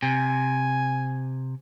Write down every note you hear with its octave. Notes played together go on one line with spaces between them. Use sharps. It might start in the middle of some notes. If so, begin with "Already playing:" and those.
C3 G#5